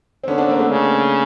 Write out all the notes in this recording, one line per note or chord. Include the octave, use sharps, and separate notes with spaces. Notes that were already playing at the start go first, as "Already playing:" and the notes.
C4
D3 B3 C#4
C4 D4
A#3 C4
A3 B3
C#3